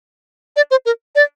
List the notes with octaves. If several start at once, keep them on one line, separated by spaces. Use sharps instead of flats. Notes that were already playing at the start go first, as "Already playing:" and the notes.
D5
C5
A#4
D5